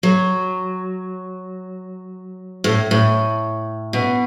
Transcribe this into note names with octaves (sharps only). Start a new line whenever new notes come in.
F#3
A2
A2
B2